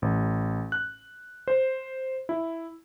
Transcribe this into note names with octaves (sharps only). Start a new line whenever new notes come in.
A1
F#6
C5
E4